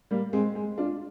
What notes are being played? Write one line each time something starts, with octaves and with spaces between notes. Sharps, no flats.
G3 A#3
G#3 C4
G#3
D4 F4